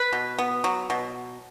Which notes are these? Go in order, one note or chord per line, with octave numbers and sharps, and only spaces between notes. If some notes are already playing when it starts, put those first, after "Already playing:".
Already playing: B4
B2
B3
F#3
B2